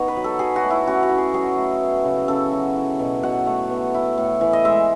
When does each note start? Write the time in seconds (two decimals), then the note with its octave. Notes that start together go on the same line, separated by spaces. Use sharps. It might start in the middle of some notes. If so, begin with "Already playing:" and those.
Already playing: B3 D#4 C#5
0.08 B4
0.17 F#3
0.24 A4
0.39 F#3 G#4
0.56 F#4
0.64 A3
0.70 E4
0.87 C#4 F#4
1.03 F#4
1.10 E4
1.18 G#4
1.34 F#3 G#4
1.57 A3
1.81 B3
2.04 C#3
2.28 C#3 A4
2.51 F#3
2.76 E4
2.99 B2
3.23 B2 F#5
3.46 A3
3.70 B3
3.94 E4
4.18 A2
4.41 E3
4.53 D#5
4.65 G#3 E5